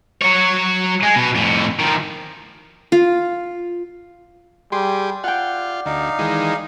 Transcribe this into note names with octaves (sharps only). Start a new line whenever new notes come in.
F#3 C#5
G#3
B2
F2 A2
D#3 F3
F4
G3 G4 G#4 C6
F4 D5 F#5 G5
D2 D#4 F5
D#3 E3 G#3